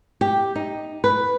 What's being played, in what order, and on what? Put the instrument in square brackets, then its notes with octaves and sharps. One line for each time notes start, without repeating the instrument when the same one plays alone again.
[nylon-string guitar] G4
D#4
B4